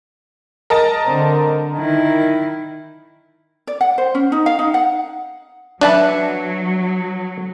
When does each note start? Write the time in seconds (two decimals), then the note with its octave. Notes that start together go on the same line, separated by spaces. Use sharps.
0.70 A#4 D#5 A5
1.05 D3 C4
1.77 D#3 E4
3.67 D5
3.81 F#5
3.98 C5
4.15 C#4
4.32 D#4
4.46 F5
4.59 D#4
4.74 F#5
5.81 F#3 D4 B4 D5 E5 A5